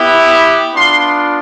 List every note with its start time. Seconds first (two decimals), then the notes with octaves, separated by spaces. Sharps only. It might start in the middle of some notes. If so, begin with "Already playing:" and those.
Already playing: B3 E4 G4
0.74 B3 D4 F4 C6